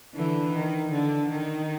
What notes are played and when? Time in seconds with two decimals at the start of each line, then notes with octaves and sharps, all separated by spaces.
0.15 D3 E3
0.53 D#3
0.91 D3
1.29 D#3